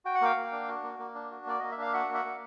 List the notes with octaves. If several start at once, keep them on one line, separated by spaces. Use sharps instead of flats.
F#4 G5
F#5
A#3 F5 G5
A#3
D4
F#4
A#3
A#3
D4
F#4
A#3 D5
A#3 D#5
E5
D4 F5
F#4 E5 F#5
A#3
E5 F#5
A#3